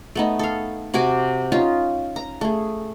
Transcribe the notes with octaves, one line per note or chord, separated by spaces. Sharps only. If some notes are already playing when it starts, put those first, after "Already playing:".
A3 B3 D#4
A4 F5
C3 F#4 G#5 D6
C#4 D#4 F4
A#5
A3 G#4